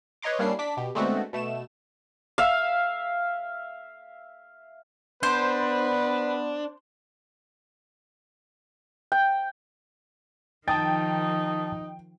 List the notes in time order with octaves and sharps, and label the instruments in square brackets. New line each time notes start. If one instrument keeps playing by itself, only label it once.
[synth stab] B4 C#5 D#5 A#5 C6 D6
G3 A#3 C#4 D4 E4 C7
D4 D6 B6
B2 G4
D3 G#3 A3 B3 C4 F#4
B2 A3 E7
[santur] E5 F5
[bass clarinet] B3 [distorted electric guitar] D4 [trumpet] B4 [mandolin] C5
[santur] G5
[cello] D#3 F3 [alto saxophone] D#4 [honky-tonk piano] G5 [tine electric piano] A5 D#6 A6